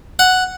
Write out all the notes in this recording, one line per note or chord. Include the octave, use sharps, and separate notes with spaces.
F#5